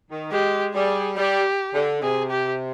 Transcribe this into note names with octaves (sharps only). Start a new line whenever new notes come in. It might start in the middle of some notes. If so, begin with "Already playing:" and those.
D#3
G#3 G4
G3 G#4
G3 G4
D3
C3 G#4
G4